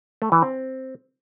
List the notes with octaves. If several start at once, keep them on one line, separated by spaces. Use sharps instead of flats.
A3
E3
C4